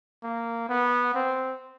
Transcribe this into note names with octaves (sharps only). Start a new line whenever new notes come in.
A#3
B3
C4